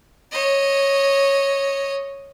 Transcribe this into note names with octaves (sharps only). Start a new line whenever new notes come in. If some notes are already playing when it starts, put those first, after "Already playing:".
C#5 D#5